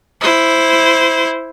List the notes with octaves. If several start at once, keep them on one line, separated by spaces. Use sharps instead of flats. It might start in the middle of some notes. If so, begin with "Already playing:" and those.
E4 C5